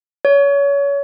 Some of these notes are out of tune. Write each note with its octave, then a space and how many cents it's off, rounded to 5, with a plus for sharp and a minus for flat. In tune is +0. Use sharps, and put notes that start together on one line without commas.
C#5 +30